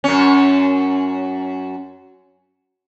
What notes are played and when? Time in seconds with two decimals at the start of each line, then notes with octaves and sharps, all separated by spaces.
0.04 F#2 C#4